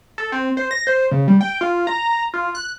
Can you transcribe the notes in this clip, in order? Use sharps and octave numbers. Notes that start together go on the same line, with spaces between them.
A4
C4
C5
A#6
C5
C#3
G3
G5
F4
A#5
F4
F#6